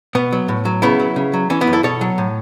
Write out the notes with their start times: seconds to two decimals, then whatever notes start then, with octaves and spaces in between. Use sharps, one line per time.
0.15 B2 B3
0.32 F#3
0.48 A2
0.65 F#3
0.82 C#3 B3 E4
1.00 F#3
1.16 C#3
1.33 F#3
1.50 E3 C#4
1.61 B3 E4
1.67 F#2
1.73 E4 A4
1.83 B2 A4 C#5
2.01 F#3
2.18 A2